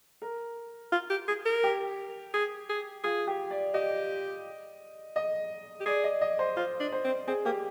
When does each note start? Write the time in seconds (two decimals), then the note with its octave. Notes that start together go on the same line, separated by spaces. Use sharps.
0.22 A#4
0.92 F4
1.10 G4
1.28 G#4
1.45 A#4
1.63 G4
2.34 G#4
2.69 G#4
3.04 F4 G#4
3.27 G4
3.51 D5
3.74 G4 D#5
5.16 D#5
5.80 G4
5.86 G#4 D5
6.04 D#5
6.21 D#5
6.39 C5
6.57 F4 C5
6.80 D4
6.92 C5
7.04 C4
7.27 C4 G#4
7.45 A#3 G4